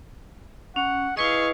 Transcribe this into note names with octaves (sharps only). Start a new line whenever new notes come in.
C#4 F#5
E4 G#4 B4 D#5 F5 C#6